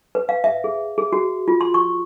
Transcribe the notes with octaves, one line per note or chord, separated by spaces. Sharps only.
B4
F5
E5
G#4
G#4
F#4
F4
C6
C#6